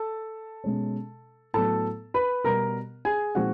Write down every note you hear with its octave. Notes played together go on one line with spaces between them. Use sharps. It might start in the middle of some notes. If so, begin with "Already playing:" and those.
Already playing: A4 A5
B2 G#3 C#4
A2 F#3 B3 A4 A5
B4 B5
B2 G3 B3 A#4 A#5
G#4 G#5
A#2 F3 G#3 C4 D#4 F#4 F#5